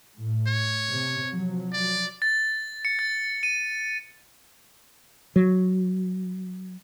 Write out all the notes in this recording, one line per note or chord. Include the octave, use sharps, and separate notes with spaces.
A2
C#5
C3
F3 F#3
D5
A6
C#7
A6
D#7
F#3